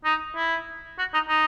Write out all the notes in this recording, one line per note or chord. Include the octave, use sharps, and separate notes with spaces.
D#4
E4
F#4
D#4
D#4